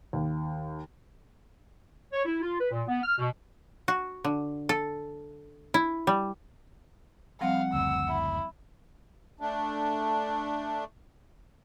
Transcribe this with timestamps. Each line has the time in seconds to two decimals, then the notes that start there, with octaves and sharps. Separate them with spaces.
0.13 D#2
2.13 C#5
2.25 E4
2.42 F4
2.59 B4
2.71 A#2
2.88 B3
3.03 F6
3.19 B2
3.88 F#4
4.25 D3
4.69 A4
5.74 E4
6.07 G3
7.41 F3 G3 C4 F5 F#5
7.74 F#1 D2 E6
8.09 E4
9.41 A3 D4